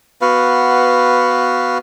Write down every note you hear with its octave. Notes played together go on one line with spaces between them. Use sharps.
B3 F#4 B4 F5